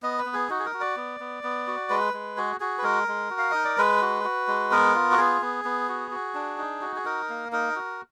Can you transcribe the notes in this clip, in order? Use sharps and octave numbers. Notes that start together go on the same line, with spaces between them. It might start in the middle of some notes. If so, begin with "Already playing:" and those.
B3 D#5
B4
B3
G#4
D#4 F#4
G#4
A#4
F#4
D5
B3
B3
B3
F#4
G#3 B4
G#3
F#4 G#4
F#4 G#4
B4
G#3 A#4
G#3
F#4
F5
D#4 D#5
D5
G#3 B4
F#4
F#4
G#3
B3 A#4
F4
F#4
B3 G#4
B3
B3
F#4
F#4
D4
D#4
F#4
G#4
D#4 A#4
A#3
D#4 A#4
F#4